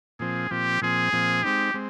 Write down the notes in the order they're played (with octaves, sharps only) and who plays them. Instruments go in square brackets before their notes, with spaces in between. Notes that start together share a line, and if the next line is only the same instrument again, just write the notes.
[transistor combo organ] A#2 F3 C4 [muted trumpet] G#4
[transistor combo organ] A#2 F3 C4 [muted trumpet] G4
[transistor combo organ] A#2 F3 C4 [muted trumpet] G#4
[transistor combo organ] A#2 F3 C4
[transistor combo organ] G#3 C4 D#4 [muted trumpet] G4
[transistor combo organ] G#3 C4